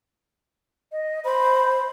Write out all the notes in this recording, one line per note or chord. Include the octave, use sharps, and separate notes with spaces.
D#5
C5 B5